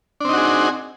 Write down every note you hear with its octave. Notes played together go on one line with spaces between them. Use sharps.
C4 D4 D#4 F#4 G#4